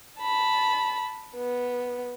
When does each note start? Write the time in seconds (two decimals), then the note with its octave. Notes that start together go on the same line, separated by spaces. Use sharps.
0.20 A5 B5
1.35 B3